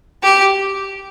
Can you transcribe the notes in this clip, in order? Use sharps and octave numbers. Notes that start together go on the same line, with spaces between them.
G4